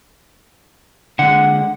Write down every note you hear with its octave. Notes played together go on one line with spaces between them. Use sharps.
D3 G#3 F#5